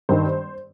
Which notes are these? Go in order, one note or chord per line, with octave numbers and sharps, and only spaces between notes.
G2 D#3 C5